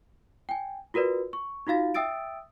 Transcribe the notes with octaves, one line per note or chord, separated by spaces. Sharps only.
G5 G#5
F4 F#4 A#4 B4 D5
C#6
D#4 F4 F#4 F5 A6
E5 G5 D#6 E6 A6 D7